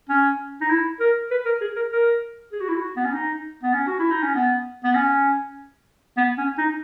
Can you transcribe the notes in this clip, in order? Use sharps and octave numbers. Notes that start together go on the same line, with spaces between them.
C#4
D#4
E4
A#4
B4
A#4
G#4
A#4
A#4
G#4
F#4
E4
F#4
B3
C#4
D#4
B3
C#4
F#4
E4
D#4
C#4
B3
B3
C#4
B3
C#4
D#4